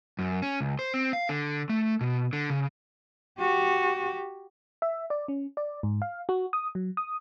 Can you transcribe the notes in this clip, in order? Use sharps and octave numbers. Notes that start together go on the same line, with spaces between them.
F#2
C#4
C#2
C5
C4
F5
D3
A3
B2
D3
C#3
F#4 G4
E5
D5
C#4
D5
G#2
F5
F#4
D#6
F#3
D#6